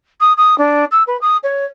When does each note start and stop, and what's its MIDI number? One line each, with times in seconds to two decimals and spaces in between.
0.20 0.33 87
0.37 0.57 87
0.58 0.85 62
0.91 1.03 88
1.07 1.19 71
1.21 1.37 87
1.43 1.65 73